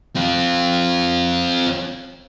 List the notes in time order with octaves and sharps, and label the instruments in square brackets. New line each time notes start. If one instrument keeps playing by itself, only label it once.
[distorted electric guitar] C4 F4